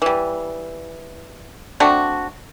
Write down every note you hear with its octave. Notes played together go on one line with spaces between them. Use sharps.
E3 G3
A3 C4 D4 F#4